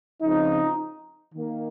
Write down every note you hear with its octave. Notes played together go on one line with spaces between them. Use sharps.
C#3 F3 C4 D#4
D#3 A#3